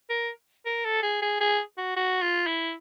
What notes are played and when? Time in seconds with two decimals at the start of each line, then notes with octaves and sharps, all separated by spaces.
0.10 A#4
0.66 A#4
0.85 A4
1.03 G#4
1.22 G#4
1.41 G#4
1.78 F#4
1.97 F#4
2.22 F4
2.47 E4